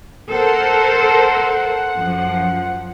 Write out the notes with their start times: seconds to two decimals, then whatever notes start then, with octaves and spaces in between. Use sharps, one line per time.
0.32 A4 A#4 C5 F#5
1.96 F#2 F3